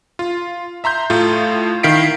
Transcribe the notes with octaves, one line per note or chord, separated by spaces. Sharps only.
F4
E5 A#5 C6 G6
A2 A3 F4
D#3 E4 F5 B6 C7 D7